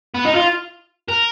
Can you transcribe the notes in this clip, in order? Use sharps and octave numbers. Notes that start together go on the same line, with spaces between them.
B3
D#4
F4
A#4